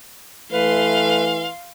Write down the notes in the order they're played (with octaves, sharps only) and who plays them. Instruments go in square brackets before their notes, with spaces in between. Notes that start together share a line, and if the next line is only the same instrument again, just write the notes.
[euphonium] E3 [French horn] A3 [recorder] B4 [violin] F5 C6